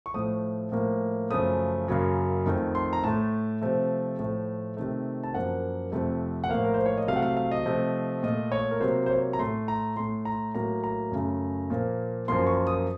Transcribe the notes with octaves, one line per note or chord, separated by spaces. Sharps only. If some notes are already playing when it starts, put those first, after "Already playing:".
C#6
A2 F3 A3 D#6
A2 F3 A#3
F#2 C#3 F3 A3 D#6
F#2 C#3 F#3 A#3
F2 D#3 A3
C6
A#5
A2 A3 A5
C3 F3 A3
A2 F3 A3
C3 D#3 A3
A5
F#2 F3 A#3 F#5
F2 C3 F3 A3
F#5
A2 F3 A#3 F5
A#4
C5
C#5
D#5
C3 F#3 A3 F5
F#5
F5
F5
D#5
C3 F3 A3
A#2 A3 D#5
C#5
A#4
C3 F#3 A#3 C5
C5
C#5
A#5
A2 A3 C6
A#5
A2 A3 C6
A#5
A2 F#3 A#3 A#5
A#5
F#2 C#3 A3
A#2 F3 A#3
F#2 F3 A#3 C6
C#6
D#6